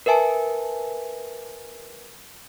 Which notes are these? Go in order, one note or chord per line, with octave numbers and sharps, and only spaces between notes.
A#4 B4 E5 G#5 A5